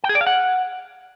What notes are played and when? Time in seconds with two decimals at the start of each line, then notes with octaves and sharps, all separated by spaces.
0.04 G5
0.09 G#4
0.15 D5
0.21 F5
0.27 F#5